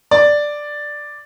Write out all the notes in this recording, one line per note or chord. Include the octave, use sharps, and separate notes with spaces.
D5